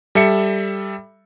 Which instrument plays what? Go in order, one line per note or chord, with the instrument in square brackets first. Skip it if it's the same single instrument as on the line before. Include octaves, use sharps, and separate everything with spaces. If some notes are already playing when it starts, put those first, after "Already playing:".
[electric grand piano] G3 A4 E5 C#7